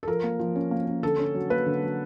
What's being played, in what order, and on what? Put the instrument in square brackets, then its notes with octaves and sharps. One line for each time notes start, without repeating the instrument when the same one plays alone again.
[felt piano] A4
F3 A#4
A#3
F3
C#4
A#3
C#4
D3 A4
C#4
F#3
A#3 B4
D3
F#3